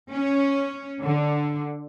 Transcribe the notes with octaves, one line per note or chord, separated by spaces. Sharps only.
C#4
D3